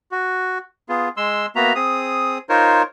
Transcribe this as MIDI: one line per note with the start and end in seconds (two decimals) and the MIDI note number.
0.12 0.58 66
0.89 1.09 59
0.89 1.09 65
0.89 1.09 68
1.17 1.46 56
1.17 1.46 84
1.17 1.46 88
1.56 1.73 58
1.56 1.73 59
1.56 1.73 66
1.56 1.73 76
1.56 1.73 82
1.75 2.38 60
1.75 2.38 68
1.75 2.38 87
2.49 2.82 63
2.49 2.82 65
2.49 2.82 70
2.49 2.82 72
2.49 2.82 73